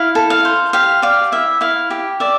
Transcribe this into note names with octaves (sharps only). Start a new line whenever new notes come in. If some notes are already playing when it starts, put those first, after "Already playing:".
Already playing: E4 F5
A4
F5
C5
G4 F5
D5 F5
E4 E5
E4 F5
G4
D5 E5